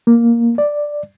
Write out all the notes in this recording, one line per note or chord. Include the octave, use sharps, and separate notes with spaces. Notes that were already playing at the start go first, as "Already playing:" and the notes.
A#3
D5